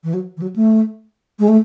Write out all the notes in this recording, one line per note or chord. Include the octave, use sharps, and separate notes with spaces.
E3
F#3
E3
F#3
A3
G#3
A3